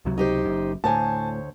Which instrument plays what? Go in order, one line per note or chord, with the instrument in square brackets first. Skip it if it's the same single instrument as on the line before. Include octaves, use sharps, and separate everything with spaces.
[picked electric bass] C#2 C3 F#3
[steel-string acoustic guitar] D#4 G4 C5
[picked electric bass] F#1 F#2
[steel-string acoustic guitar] D2 C5 C#5 [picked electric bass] A2 [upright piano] G#5 A5